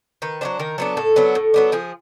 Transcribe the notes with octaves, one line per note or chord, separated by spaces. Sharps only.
D#3 B4
F#3 B3 D4 C5
D#3 A#4
F#3 B3 D4 A4
A2 A4
F#3 B3 D4
A2
F#3 B3 D4
F3 G#4